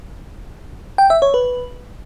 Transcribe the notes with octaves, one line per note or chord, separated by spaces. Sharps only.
G5
E5
C#5
B4